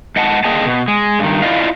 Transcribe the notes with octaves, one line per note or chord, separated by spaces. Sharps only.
G#2 D#5 F#5 A5
D3 A#3 G#4 D#5 G5 A5
B2
G#3
G2 D#3
E4 F4 D5 D#5 F5